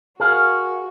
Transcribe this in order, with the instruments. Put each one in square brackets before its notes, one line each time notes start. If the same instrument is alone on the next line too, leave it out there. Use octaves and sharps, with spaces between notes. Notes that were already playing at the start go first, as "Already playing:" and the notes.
[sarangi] F#4 [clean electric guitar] G#4 A#4 F5